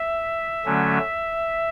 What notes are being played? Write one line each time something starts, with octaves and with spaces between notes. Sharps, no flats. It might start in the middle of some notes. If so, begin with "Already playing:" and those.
Already playing: E5
D3 F#3 A3 C#4